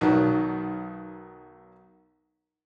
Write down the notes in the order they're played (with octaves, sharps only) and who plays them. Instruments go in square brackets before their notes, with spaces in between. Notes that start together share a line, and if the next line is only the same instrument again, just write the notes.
[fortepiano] B1 D#3 F#3